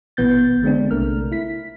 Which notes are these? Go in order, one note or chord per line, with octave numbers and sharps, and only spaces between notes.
A1 B2 E3 B3 G6 A6
D3 G#3 B3 C4 D4
B1 C3 A3 A#4 F6
E4 B6